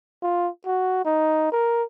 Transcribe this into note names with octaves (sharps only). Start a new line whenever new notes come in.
F4
F#4
D#4
A#4